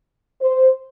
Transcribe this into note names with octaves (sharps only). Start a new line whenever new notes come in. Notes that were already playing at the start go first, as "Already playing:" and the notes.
C5